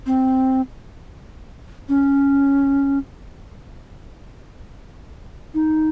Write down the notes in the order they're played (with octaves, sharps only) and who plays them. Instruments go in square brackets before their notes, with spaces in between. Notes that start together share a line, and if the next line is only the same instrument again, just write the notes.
[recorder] C4
C#4
D#4